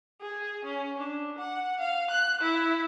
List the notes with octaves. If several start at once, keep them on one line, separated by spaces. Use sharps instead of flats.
G#4
C#4
D4
F#5
F5
F#6
E4